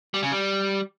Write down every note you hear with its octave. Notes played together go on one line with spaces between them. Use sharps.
G3
C#3
G3